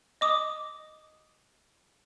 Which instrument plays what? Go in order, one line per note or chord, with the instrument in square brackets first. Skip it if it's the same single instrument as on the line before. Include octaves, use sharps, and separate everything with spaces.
[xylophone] D#5 D6 D#6